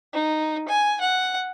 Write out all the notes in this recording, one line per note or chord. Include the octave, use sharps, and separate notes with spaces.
D#4
G#5
F#5